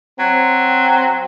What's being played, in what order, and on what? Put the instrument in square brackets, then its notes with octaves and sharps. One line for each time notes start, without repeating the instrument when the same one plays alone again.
[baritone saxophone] F#3 [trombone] C4